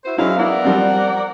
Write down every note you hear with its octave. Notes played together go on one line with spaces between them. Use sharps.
E4 F#4 C5
F#3 G#3 C#4 E4 F5
B3 E4 A#4 D5 F#5
F3 G3 C4